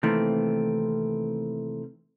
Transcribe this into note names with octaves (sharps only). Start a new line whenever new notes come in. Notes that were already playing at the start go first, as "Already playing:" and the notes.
C3 D#3 E3 A3 A#3 C4